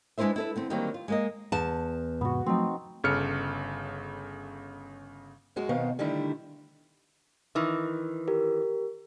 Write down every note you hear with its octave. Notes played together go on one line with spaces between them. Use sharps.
G#3 D4 E4 B4 C5 E5
E4 A4 B4
D3 B3 C4
D3 D#3 F#3 G3 A#3 C4
F4
G#3 A#3 D#5
E2 A5
G#2 C3 B3 F#4
F3 F#3 A3 C4 D#4
G1 C#3 A4 F6 C#7
F#2 G#3 F#4
B2 D#3 B3 C4 F5
D3 D#3 G3 A3 D4 E4
D#3 E3
G4 A#4